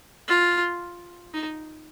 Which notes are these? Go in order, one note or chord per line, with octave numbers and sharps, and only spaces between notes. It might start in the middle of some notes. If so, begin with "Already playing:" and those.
F4
D#4